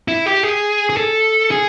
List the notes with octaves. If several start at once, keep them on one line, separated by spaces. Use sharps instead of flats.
E4
G4
G#4
G#4
A4
G#4